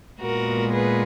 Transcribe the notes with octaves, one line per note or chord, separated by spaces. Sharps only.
A#2 G#3 B3 F#4 A#4
G#4 B4